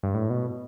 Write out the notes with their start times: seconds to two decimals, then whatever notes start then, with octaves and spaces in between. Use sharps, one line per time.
0.03 G2
0.14 A2
0.30 B2